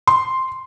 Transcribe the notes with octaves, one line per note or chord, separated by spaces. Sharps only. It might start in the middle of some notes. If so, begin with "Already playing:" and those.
C6